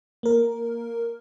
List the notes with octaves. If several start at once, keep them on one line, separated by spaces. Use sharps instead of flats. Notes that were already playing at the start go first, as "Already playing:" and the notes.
A#3 A#4